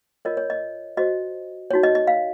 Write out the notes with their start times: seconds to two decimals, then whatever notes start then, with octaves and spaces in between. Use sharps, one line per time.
0.25 F4 A#4 C#5 D#5
0.37 C#5
0.50 D#5
0.97 F#4 C5 D#5
1.71 D#4 F#4 C#5
1.83 D#5
1.95 D#5
2.07 F5